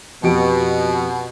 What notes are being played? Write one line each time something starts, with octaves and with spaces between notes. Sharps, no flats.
F2 B2 G4 D7